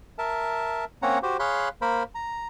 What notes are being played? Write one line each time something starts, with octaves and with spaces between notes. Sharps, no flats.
A#4 E5 A5
A#3 C4 C#4 C#5 F#5 A#5
F#4 G4 C5
G#4 C#5 F5 B5 C6 F#6
A#3 A#4 C5 B5
A#5